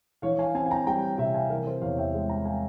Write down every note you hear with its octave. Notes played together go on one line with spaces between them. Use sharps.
E3 C#5 F5
F5 G#5
C4 F5 G#5
G#5
G5 A#5
G3 G5 A#5
C3 E5 G5
F5 G#5
E3 A#4
C5
E2 C#5 F5
E5 G5
G#3
G5 A#5
F5 G#5